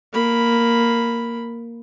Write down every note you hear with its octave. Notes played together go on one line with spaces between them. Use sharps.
A#3 B5